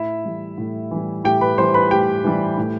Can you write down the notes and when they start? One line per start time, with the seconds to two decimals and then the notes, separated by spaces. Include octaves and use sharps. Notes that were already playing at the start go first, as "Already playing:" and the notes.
Already playing: A2 E4 E5
0.25 E3 G3
0.58 A2
0.91 E3 G3
1.24 A2 G4 G5
1.41 B4 B5
1.58 E3 G3 C5 C6
1.74 B4 B5
1.91 A2 G4 G5
2.24 E3 G3
2.58 A2